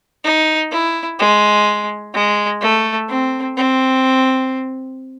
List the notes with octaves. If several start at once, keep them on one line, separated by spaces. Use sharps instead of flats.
D#4
E4
G#3
G#3
A3
C4
C4